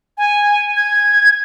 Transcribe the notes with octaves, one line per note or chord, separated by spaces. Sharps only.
G#5
G#6